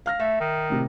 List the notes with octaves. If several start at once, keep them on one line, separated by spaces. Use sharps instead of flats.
F5 F6 A#6
A3 E5
D#3
A2 C3